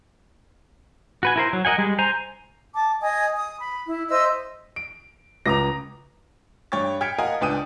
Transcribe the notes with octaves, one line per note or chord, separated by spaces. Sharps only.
F#4 B4 G#5
E4 A#4 C5
F#3
A#4 D#5 F#5 G#5
G3 G#3
C5 G#5 A#5
A5 D6
D#5 G#5 D#6
D#6
B5
E4
C5 D#5 E5 E6
D7
C#2 A#5 D6 D#6 A#6
G2 C#5 G5 C#6 A6
G5 F6 G#6 B6 C#7 D7
A#4 D#5 F5 F#5 G#5 A#5
C#2 D4 B4 G5 D#6 D#7